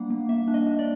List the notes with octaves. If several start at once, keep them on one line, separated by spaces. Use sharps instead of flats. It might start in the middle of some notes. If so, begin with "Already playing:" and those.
Already playing: G3 A#3 D4 F#5
A#3
A#3 E5
D4
D#5
D4
D5